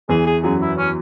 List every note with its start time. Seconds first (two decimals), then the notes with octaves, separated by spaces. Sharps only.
0.09 E2 E3 G#4
0.26 G#4
0.43 F#2 F#3 G#4
0.61 E4
0.77 C#4